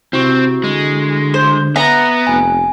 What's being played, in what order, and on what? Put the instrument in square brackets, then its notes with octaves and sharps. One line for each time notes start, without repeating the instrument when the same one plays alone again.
[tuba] C3 [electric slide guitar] C4 [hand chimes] E4 F#4 C#6
[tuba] D3 [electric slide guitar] G#3
[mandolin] C5
[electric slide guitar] B3 [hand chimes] E5 [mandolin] A#5
[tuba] F1 [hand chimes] G#5